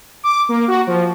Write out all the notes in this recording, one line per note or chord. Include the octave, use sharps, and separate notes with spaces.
D6
A#3
F#4
F3